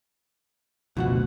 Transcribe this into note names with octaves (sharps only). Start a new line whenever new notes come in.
F#1 D2 B2 F3 F#4 F#5